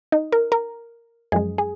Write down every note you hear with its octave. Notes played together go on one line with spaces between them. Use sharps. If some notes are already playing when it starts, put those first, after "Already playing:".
D#4
A#4
A#4
F#2 F3 G#3 G#4
G#4